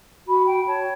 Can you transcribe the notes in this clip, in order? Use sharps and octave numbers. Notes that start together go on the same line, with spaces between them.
F#4 B5
G5
C#5 A5